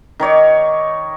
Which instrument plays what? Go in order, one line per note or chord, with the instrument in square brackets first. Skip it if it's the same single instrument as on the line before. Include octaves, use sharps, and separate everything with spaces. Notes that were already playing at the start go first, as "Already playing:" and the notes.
[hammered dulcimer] D#3 D#4 C#5 D5